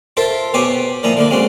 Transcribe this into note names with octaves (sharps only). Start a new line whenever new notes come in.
F4 A4 A#4 C5 E5
B2 G4 C5 C#5 G#5 D6
A#2 F3 E4 A#5 D#6
D3 A#3 D#4
G#3 C4 C#4 F#4